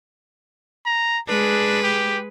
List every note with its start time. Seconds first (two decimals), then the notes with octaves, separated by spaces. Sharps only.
0.86 A#5
1.29 G#3 D4 G#4 B4
1.83 G4